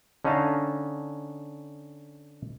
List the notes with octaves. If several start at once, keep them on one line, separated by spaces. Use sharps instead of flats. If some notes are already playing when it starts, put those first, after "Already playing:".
D3 C#4 D#4 D#5 F5 A5